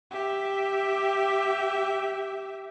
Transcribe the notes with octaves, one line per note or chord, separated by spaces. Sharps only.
G4 E5